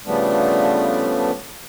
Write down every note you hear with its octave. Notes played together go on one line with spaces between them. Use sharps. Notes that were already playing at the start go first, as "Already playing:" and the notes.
C#3 F3 G3 A3 B3 D4